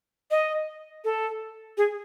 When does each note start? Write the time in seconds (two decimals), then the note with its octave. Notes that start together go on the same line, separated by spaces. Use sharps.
0.31 D#5
1.04 A4
1.78 G#4